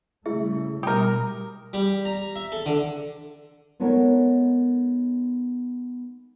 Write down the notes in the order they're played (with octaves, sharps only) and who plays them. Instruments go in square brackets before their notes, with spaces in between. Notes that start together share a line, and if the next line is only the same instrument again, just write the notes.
[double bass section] C#3 G3 A3 [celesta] E4 G#4 E5
[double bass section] B2 G3 [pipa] G4 A#4 [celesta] D#6
[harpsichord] G3
A#5
E5
A4
D3
[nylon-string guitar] G#3 B3 D#4 A4 A#4 C#5